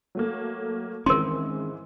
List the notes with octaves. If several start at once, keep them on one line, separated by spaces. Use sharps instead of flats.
F#3 A3 A#3
G#2 D#3 E3 G#3 C4 C#4 A#4 C6